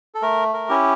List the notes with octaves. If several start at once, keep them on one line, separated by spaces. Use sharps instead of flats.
A4
A3 A#4
A#4
C#4 E4 G4